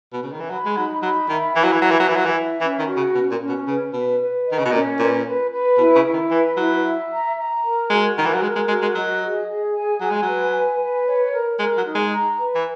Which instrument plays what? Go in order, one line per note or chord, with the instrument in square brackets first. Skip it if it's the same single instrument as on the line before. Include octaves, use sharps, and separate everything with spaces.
[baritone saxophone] B2
C#3
D#3
E3
[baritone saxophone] F#3 [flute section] B5
[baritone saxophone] G#3
[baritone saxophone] F#3 [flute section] D#4
[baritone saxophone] F#3 [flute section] B5
[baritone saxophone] D#3 [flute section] E5
[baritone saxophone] E3 [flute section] E4
[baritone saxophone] F#3
E3
[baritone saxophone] F#3 [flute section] E5
[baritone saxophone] E3
F#3
[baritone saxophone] E3 [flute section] E4
[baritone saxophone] F#3
E3
[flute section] E5
[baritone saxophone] E3 [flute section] C#4
[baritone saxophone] D#3
[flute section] F#4
[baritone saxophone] C#3
[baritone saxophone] B2 [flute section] C#4
[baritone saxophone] A#2
[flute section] C#4
[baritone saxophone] B2
[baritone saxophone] C#3 [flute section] B4
[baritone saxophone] B2 [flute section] B4
[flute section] B4
D#5
[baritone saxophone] D#3
C#3
B2
[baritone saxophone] A#2 [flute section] C#4
[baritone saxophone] A#2 [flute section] B4
[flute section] B4
B4
[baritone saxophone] B2 [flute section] E4
[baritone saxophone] C#3
[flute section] E4
[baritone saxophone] D#3
[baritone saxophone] E3 [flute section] B4
[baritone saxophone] F#3 [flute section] E4
[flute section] E5
A#5
A#5
A#4
[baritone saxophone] G#3 [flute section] F#4
[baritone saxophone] D#3 [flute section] A#4
[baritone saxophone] E3
F#3
[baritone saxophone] G#3 [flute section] A#4
[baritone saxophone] G#3
[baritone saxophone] G#3 [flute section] F#4
[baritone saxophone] G#3
[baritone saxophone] F#3 [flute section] D#5
[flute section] G#4
G#4
G#5
[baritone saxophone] F#3 [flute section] G#5
[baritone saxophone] G#3
[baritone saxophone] F#3 [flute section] B4
[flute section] G#5
B4
C#5
A#4
[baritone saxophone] G#3 [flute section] A#4
[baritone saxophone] F#3
[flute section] D#4
[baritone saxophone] G#3
[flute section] A#5
B4
[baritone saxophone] E3